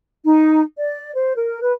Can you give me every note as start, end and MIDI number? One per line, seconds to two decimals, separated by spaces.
0.24 0.60 63
0.78 1.13 74
1.14 1.33 72
1.35 1.59 70
1.62 1.72 71